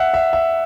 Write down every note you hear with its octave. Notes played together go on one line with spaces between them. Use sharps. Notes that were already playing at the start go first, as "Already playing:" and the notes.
Already playing: E5 F#5
E5
E5